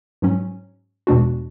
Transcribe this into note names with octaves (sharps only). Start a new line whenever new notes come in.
G#2 F#3 C#4
E2 B2 G#3 D4 F#4